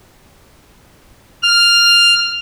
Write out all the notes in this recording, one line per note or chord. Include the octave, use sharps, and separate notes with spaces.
F6